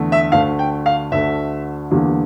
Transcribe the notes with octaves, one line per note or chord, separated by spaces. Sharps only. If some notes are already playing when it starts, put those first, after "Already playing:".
Already playing: E2 D3 A3
E5
D2 D3 A3 F5
G5
F5
D2 D3 A3 E5
E2 D3 G3 A#3